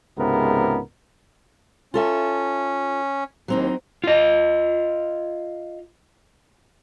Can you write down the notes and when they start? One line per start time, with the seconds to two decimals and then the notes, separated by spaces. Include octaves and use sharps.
0.18 C#2 G#2 C3 B3 A#4
1.94 C#4 F4 A4 E5
3.48 D#2 F#3 C4 D#4
4.04 F4 D#5